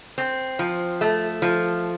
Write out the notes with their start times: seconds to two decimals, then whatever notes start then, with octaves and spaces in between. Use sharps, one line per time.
0.18 C4
0.59 F3
1.01 A3
1.42 F3